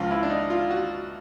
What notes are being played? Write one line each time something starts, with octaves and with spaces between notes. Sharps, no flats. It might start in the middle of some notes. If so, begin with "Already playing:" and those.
Already playing: C#2 C#3 F3 F4
E4
D4
D#4
F4
F#4